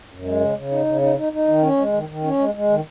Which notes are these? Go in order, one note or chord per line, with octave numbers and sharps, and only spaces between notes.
F#2
G#3
C#3
C#3
D#4
C#3
D#4
D#4
D#4
D#3
C#4
G#3
D#3
D#3
C#4
G#3
G#3
D#3